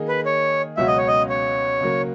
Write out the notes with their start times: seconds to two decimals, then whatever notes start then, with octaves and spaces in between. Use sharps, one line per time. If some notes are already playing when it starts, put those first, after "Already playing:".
Already playing: D#3 A#3 D#4 G#4
0.08 B4
0.26 C#5
0.77 C#2 B2 F#3 C#4 F#4 E5
0.87 D#5
0.97 C#5
1.08 D#5
1.29 C#5
1.81 C#3 F#3 A#3